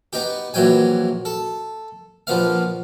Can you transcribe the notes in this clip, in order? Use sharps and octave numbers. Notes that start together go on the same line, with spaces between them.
B3 D#4 G4
A#1 E3 F#3 G5 G#5
A4
A#1 F3 B3 F5